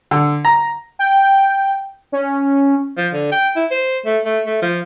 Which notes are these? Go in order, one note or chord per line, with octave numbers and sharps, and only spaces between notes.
D3
A#5
G5
C#4
F3
D3
G5
E4
C5
A3
A3
A3
F3